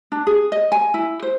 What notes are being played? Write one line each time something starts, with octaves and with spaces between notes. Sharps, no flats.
D4
G#4
D#5
G#5
E4
C5